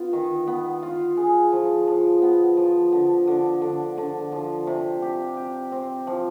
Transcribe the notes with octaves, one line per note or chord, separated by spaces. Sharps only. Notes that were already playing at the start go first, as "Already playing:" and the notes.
Already playing: B3 F4
D#3
B3
F4
G#4
F3
F3
B3
F3
D3
D3
D3
D3
F3
C3
G4
G4
C4
F3